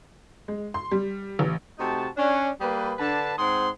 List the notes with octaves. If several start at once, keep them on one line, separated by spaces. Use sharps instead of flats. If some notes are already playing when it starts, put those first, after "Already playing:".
G#3
C6
G3
A1
C3 A3 D#4 F#4 A5
C#4 D4 C#5
G3 A#3 G#4 B4
D3 D4 B4 A5
G#2 C4 G#4 C5 F#5 C6